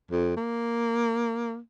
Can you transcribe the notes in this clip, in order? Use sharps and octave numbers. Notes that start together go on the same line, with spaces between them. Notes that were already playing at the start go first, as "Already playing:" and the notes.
F2
A#3